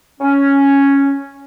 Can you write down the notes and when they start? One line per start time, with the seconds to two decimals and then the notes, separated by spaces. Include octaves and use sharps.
0.21 C#4